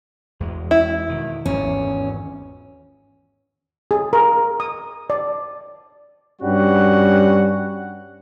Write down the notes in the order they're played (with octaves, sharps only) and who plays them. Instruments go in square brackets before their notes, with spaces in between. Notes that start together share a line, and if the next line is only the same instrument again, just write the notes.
[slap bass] E2 G#3
[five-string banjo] E4
[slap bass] B2 D#3
[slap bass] G#1 E2 [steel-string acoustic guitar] C#4
[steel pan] G#4
A#4
D#6
D5
[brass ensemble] G2 G3 C#4 F#4 F#5